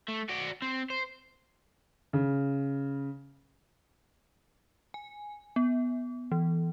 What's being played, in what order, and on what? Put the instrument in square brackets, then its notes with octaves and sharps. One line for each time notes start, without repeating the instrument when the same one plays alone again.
[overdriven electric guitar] A3
F#4 D5
C4
C5
[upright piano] C#3
[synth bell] G#5
B3
E3